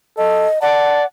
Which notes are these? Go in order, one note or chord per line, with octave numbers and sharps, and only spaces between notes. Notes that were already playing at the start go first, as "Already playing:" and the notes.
A4 D#5
D5 F#5 A5